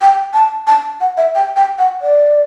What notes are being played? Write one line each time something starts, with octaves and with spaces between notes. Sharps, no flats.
G5
A5
A5
F#5
E5
G5
G5
F#5
D5